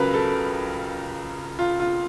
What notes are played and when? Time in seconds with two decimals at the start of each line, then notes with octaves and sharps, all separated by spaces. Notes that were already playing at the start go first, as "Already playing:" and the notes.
Already playing: C#2 C#3 F#3 A#4 B4
0.14 A4
1.59 F4
1.80 F4